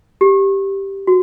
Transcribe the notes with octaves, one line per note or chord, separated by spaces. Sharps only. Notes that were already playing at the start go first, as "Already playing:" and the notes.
G4
F#4